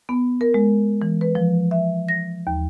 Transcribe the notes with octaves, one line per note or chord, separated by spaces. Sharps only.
B3
A#4
G#3
E3
B4
F3
E5
A#6
D#2